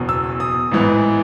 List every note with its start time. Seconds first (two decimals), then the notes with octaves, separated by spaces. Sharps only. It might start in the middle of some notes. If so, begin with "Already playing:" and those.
Already playing: F#1 E2 B2
0.09 E6
0.40 D#6
0.71 A1 G#2 E3 B3